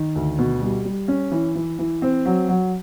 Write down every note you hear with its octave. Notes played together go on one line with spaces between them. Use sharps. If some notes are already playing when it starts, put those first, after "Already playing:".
Already playing: D#3
D2
B2
G3
G3
C#4
E3
E3
E3
C4
F#3
F#3